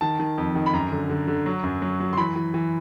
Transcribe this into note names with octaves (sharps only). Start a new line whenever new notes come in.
D#3 A5
D#3
F2
D#3
B5
F#2 A#5
D3
D3
D3
F#3
F#2
F#3
F#3
C6
E3 B5
E3
E3